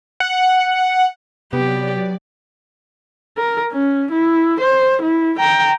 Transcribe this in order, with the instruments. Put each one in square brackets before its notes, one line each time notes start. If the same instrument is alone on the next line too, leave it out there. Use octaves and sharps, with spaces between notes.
[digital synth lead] F#5
[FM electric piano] C3 [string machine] F#3 D5 [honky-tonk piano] B3 [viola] G4
[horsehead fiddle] A#4
C#4
E4
C5
E4
G5 A#5